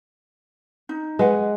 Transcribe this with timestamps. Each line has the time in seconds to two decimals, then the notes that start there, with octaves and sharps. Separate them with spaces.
0.89 D#4
1.19 G#3 B4 F#5